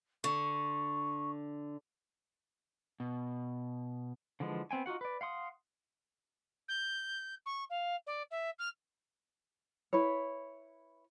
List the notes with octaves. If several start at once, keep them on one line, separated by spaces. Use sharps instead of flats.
D3 C#6
B2
D3 E3 F3 G#3
B3 C4 G5 G#5
D#4 F4 F#4 F#5
B4 D5
F5 F#5 C6 D#6
G6
C#6
F5
D5
E5
F6
E4 B4 C#5